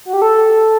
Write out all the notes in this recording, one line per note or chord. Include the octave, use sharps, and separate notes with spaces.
F#4
G4
A4